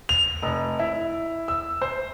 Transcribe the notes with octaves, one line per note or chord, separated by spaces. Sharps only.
F7
F1
E4
E6
C5